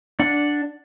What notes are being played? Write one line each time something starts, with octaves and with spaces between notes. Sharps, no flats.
D4 F#5